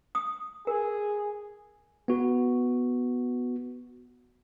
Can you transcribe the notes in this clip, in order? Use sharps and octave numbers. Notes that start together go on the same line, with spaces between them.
D#6
G#4 A#4
B3 F#4